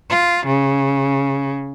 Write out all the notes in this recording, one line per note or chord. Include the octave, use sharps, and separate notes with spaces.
F4
C#3